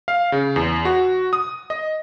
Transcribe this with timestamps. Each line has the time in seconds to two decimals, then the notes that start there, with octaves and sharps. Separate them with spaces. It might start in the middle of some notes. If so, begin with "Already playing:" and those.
0.08 F5
0.32 C#3
0.56 E2
0.85 F#4
1.33 D#6
1.70 D#5